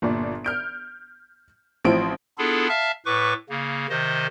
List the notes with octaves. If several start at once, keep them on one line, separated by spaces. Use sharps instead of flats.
G1 A#2 D5
F6 G6 D7
A1 F3 C4 E4 C5 D7
B3 D4 E4 F4 G#4 A4
E5 F5 A5 F6
A2 B4 C#6 D6
C#3 A#3
C3 D#3 C5 D#5